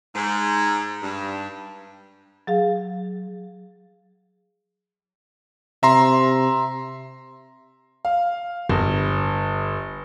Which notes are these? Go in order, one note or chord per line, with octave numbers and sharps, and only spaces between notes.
G#2
G2
F#3 G#4 F5
C3 E5 A#5 C6
F5
G1